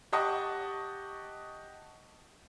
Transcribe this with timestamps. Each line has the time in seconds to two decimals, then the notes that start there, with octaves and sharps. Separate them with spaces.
0.12 G4 D#5 F#5 A5 C#6